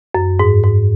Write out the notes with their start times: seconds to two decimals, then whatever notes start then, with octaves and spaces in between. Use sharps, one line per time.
0.15 F#2
0.39 G#2
0.63 G#2